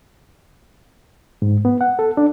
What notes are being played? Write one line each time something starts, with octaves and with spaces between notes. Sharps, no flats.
G#2
B3
F#5
A4
D4